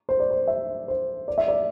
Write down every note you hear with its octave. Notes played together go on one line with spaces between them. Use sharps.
C5
D5
C5
E5
C5
D5
E5
D5